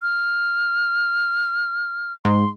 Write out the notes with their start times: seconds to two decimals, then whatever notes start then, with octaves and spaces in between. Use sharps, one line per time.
0.02 F6
2.25 G#2 C6